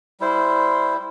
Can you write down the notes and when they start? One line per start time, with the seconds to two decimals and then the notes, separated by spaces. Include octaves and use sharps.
0.20 G3 E4 C5